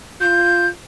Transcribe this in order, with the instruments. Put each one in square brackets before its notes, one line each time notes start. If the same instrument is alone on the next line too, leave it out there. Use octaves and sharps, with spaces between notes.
[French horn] F4 [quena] G6